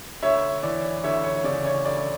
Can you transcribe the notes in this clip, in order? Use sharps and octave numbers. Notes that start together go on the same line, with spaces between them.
D2 C#5 E5
E3 D5
D2 C#5 E5
C#5
C#5
C#3 D5
C#5
D2 D5